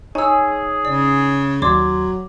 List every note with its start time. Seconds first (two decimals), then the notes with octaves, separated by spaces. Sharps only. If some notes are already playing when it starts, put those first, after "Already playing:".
0.15 D#4 G#4 C#5 G#5 E6
0.85 C#3 D5
1.62 D#2 F#3 D5 C6 D6 G#6